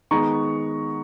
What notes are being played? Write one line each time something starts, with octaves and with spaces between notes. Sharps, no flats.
D#3 G#3 B3 A#5 C#6